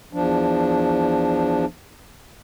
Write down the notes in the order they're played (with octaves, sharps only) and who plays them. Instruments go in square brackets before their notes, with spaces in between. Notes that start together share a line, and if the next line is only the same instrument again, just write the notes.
[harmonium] E2 F3 D4